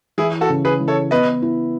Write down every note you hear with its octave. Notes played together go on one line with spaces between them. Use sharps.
E3 E4 G#4
F#4 A4
C#3
G#4 B4
E3
A4 C#5
B3 B4 D#5
E4